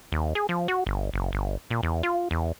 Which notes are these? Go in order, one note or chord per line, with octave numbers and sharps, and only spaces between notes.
D#2
G#4
F3
F#4
G1
F#1
G1
A#2
E2
F4
E2